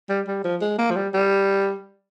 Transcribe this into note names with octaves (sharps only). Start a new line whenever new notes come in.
G3
G3
F3
G#3
A#3
F3
G3
G3